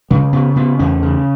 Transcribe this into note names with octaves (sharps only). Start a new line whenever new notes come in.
C#3 G#3
C#3 B3
C#3 B3
E2 C#4
C#3